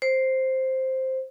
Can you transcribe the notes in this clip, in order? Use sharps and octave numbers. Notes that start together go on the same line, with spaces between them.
C5